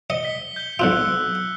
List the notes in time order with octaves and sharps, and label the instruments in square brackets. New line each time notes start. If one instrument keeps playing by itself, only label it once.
[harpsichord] D#5 [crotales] C#7 G7
[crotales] B6 G7
G6 G7
[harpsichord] B1 B2 F4 [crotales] E6 F#6 C#7